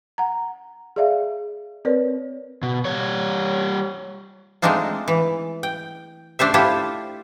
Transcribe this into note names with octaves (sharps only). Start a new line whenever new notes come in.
F#5 A#5
G#4 D5 E5 F5
C4 A#4 B4 C#5 D5
B2
G3 C#5
G#3 A3 C4 D4 D#4 F4
E3
G5
A3 D4 A4 C5 E5
D4 E4 F4 G4 A4 C5